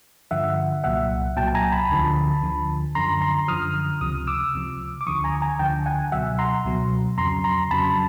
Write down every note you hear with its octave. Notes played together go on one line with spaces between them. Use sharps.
G2 D3 F3 E5 F#5
C2 A#2 F#3 E5 F#5
C2 A#2 F#3 G5 A5
A5
G#5 A#5
A5 B5
D2 D3 F3
D2 D3 F3
F#2 D3 F3 A#5 C6
A#5 C6
F#2 D3 F3 D#6 F6
C#2 C3 F3 D#6 F6
D6 E6
C#2 C3 F3
D6
D2 D3 F3 C#6 D#6
G#5 A#5
G#5 A#5
D2 D3 F3 G5 A5
F#5 G#5
C#2 B2 F#3 E5 F#5
A#5 C6
C#2 B2 F#3
F2 C#3 F#3 A#5 C6
A#5 C6
F2 C#3 F#3 A5 B5